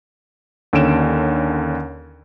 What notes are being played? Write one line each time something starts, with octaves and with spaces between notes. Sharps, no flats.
D#2 D3 C#4 D7 E7